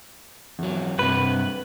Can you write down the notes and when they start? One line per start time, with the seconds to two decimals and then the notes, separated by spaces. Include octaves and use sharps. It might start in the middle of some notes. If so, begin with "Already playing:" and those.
0.59 E2 F#3
0.99 G2 C3 B4